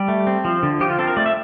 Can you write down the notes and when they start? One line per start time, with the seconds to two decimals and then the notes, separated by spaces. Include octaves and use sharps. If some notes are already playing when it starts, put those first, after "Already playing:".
Already playing: G3 G4
0.08 A3
0.27 C4
0.45 F3
0.63 D3
0.80 F3 G4
0.90 F4
0.98 C4 A4
1.08 A#4
1.17 A3 D5
1.26 E5